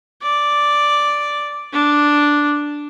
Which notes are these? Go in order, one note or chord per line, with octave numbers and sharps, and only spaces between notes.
D5
D4